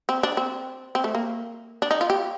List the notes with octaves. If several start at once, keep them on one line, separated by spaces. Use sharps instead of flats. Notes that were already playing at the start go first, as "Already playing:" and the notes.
C4
D4
C4
C4
A3
A#3
D4
D#4
F4
G4